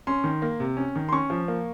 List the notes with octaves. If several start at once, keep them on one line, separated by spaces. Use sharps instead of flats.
C#4 C6
D#3
A#3
C3
C#4
D#3
C6
C#4 C#6
F3
A#3